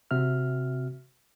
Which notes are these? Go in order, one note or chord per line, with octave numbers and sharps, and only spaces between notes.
C3 C4 F#4 E5 F6